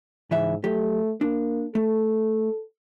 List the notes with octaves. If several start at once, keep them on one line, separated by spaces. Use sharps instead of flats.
G#2 C#3 E3 E5
F#3 A3 G4
A#3 D4
A3 A4